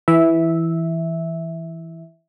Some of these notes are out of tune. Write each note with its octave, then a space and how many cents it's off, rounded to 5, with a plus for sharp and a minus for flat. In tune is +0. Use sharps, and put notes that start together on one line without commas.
E3 +0 E5 -10